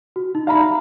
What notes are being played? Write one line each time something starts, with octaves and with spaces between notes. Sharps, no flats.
F#4
D#4
E5 F5 A#5 B5